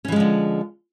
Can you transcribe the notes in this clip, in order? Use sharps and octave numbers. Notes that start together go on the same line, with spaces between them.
D3 E3 F3 G#3 C#4